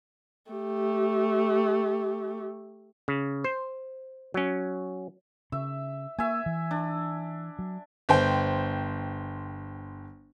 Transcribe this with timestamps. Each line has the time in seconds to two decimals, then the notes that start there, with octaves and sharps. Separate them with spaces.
0.51 A3 G4
3.08 C#3
3.44 C5
4.34 F#3 C#4
5.52 C#3 E5
6.19 A#3 E5 G#5
6.46 E3
6.71 D4
7.59 F#3
8.09 G1 C5 G5